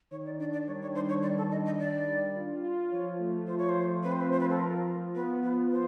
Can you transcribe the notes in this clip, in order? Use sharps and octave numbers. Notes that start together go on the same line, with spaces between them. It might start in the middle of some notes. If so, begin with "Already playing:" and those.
D#3 C#5
D5
D4 D5
D5
G3 C#5
C#5
D#3 C5
C#5
G3 D5
A4
G3 D#5
D#5
D#3 D5
G3
F4
F4
F3 C#5
A3
F3 C5
C#5
C5
F3
C4 B4
C5
B4
F4 C5
B4
A4
F3 A#4
F3
B3 B4
F3 B4
F3 C5